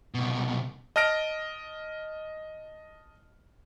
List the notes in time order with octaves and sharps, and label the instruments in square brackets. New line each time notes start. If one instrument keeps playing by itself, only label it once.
[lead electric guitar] C2 B2
[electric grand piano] D#5 A5 F6 A#6 D7